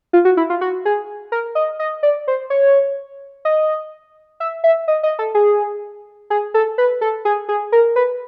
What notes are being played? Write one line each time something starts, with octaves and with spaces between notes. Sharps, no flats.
F4
F#4
E4
F4
F#4
G#4
A#4
D#5
D#5
D5
C5
C#5
D#5
E5
E5
D#5
D#5
A4
G#4
G#4
A4
B4
A4
G#4
G#4
A#4
B4